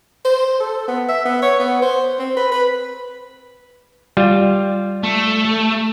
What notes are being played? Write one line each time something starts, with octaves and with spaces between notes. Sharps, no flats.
C5
A4
B3
E5
B3
C#5
B3
C5
C4
B4
B4
G3 F4
A3